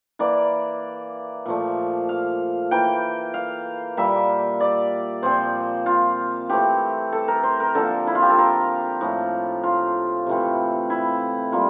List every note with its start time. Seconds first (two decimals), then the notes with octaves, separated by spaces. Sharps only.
0.19 E3 A#3 D5
1.46 A#2 F3 A3
2.09 F5
2.71 E3 A#3 G5
3.34 F5
3.97 A#2 G3 A#3 E5
4.60 D5
5.23 A#2 F3 C4 C5
5.86 F4
6.49 E3 A3 C4 G4
7.12 A4
7.28 A#4
7.43 C5
7.60 A#4
7.75 D3 F3 A#3 A4
8.07 E4
8.15 F4
8.22 G4
8.30 A4
8.39 A#4
9.01 A2 F3 A3
9.63 F4
10.26 C3 E3 A3 C4
10.90 E4
11.52 G3 A#3 F4